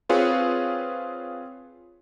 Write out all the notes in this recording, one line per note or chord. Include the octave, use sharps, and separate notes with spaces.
C4 F4 G#4 B4 C#5